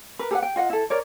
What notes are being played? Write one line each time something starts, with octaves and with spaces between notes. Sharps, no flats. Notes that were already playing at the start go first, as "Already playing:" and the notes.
A#4 B4
G4 A4 B4 F#5
G5
F4 D#5 F#5
E4 A4
A#4 C#5 D5